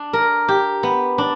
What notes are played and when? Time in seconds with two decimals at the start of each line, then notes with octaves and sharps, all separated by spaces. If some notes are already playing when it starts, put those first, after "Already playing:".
Already playing: D4
0.13 A#4
0.48 G4
0.83 B3
1.18 D4